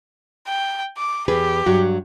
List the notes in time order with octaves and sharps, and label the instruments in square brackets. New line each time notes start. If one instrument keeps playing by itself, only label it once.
[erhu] G5
D6
[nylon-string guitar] E2 G#4 B4 [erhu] G4
[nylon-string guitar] G2 F#3 F#4